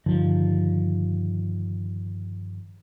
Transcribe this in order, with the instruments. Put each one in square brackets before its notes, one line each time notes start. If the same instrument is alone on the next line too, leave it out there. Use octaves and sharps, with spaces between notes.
[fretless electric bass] G2 D3 D#3 F3